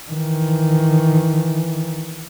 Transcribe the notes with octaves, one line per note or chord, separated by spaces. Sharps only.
D#3 E3